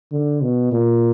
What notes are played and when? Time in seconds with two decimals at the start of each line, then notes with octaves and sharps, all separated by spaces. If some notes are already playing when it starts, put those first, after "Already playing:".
0.12 D3
0.42 B2
0.72 A#2